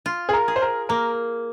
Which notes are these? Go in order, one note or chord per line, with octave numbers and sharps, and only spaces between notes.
F4
G#4
A#4
G#4
C5
A#4
A#3 A#4